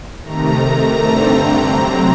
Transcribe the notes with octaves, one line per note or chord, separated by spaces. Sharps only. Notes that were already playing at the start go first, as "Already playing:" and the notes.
C3 D#3 A3 A#5
G2 D3 A3 C4 A#5
C3 F#3 C4 A#5